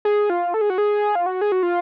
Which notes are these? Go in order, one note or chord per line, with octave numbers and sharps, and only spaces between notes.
G#4
F4
A4
G#4
F#4
G#4
F4
F#4
G#4
F#4
F4